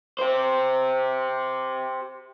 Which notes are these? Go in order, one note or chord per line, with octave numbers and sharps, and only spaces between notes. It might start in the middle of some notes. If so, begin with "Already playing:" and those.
G4 C5